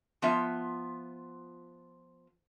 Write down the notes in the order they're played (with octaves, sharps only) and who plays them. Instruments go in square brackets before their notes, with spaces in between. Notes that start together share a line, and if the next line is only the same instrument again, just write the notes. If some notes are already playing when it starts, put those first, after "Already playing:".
[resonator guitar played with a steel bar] F3 B3 F4 E5